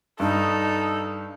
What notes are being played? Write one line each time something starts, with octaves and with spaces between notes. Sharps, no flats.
G2 D#4 A4